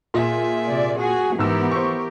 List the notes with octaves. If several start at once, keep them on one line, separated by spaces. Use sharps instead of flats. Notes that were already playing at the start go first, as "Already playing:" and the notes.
A#2 G#4 E5
C3 D5
F#4 G#4 G#5
G#2 E3 B3 G4 A#4 E6
C5 C#6